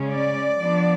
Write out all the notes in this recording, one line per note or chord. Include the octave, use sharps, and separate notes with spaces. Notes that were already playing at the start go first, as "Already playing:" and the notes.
Already playing: C#3 G#3 C#4
D5
F3 B3 D4